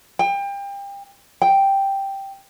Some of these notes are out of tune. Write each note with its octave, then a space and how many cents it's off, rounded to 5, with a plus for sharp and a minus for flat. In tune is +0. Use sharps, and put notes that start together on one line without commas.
G5 +30
G5 +0